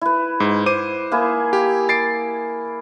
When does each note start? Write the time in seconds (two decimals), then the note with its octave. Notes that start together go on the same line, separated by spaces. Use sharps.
0.02 E4 B4
0.40 G#2
0.66 C5 D6 D#7
1.12 A#3 E4 G#4
1.53 G4
1.89 A6 C7 D7